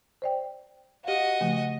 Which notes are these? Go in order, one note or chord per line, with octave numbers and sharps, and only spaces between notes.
C5 D5 G5
F#4 G4 D#5 F5
C#3 F3 A3